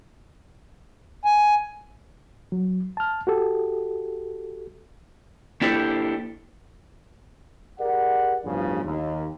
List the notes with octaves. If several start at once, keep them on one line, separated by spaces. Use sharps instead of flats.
G#5
F#3
A5 F6
F#4 G4 A4
A#3 D4 E4 G4 A4 C5
G4 G#4 A#4 D5 F#5
A1 E2 G2 C#3 F3
D#2